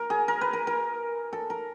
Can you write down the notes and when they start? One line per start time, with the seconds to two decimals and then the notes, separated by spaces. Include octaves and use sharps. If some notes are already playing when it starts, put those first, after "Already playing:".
Already playing: A#4
0.10 G#4
0.28 A#4
0.41 B4
0.53 A#4
0.67 A#4
1.33 A4
1.50 A#4